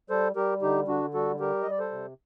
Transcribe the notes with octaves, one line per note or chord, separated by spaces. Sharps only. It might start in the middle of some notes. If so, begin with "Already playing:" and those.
G3 A4 C5
G3 G4 A#4
D3 D#4 G4
D3 D4 F#4
G3 F#4 A4
G3 G4 A#4
D#5
G3
D5
A4 C5
C3